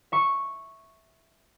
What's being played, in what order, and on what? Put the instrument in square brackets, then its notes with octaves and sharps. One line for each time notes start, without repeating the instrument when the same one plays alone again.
[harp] E5 C#6